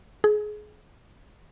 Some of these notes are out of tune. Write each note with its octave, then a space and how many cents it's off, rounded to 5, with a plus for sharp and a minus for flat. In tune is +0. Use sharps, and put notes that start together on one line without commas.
G#4 +25